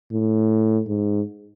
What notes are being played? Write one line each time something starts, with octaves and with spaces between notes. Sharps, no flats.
A2
G#2